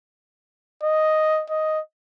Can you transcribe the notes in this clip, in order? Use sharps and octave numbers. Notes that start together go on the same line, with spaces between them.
D#5
D#5